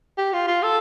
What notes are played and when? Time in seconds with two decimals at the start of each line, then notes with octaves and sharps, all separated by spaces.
0.18 G4
0.33 F4
0.48 F4
0.63 A4